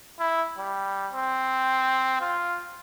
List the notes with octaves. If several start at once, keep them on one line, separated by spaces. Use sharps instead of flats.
E4
G3
C4
F4